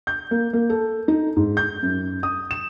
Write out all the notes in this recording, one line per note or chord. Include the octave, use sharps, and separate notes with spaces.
G6
A#3
A#3
A4
D#4
G#2
G6
F#2
D#6
E7